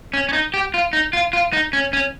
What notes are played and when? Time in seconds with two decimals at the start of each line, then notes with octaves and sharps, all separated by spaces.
0.13 C#4
0.29 C#4
0.33 D#4
0.54 G4
0.74 F4
0.93 D#4
1.13 F4
1.33 F4
1.53 D#4
1.73 C#4
1.93 C#4